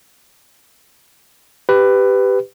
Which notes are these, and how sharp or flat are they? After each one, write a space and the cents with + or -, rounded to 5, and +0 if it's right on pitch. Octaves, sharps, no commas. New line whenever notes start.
G4 +0 B4 +15